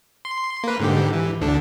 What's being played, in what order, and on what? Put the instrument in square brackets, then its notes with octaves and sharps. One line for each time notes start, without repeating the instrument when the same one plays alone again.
[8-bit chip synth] C6
A#3 B4
G#2 D3 G4
E3
D2 D3 D4